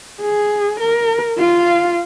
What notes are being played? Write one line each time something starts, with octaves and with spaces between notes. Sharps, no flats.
G#4
A#4
F4 F5